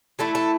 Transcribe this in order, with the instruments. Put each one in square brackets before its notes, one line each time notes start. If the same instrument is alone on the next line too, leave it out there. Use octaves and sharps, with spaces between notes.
[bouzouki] E3 A3 E4 A4
A4